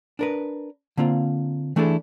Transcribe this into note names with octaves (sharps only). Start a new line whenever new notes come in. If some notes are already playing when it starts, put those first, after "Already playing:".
D4 A#4 B4
D3 A#3 C4 F4
E3 A3 D4 E4 G#4 A4